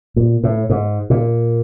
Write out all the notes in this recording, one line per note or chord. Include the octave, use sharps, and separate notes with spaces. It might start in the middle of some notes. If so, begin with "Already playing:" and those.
A#2
A2
G#2
A#2